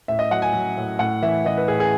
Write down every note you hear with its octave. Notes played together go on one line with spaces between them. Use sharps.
A2 E5
D#5
F#3 F#5
G#5
F#3
A2
A2 F#5
E3 E5
E3 D#5
B4
A2 G#4
G#4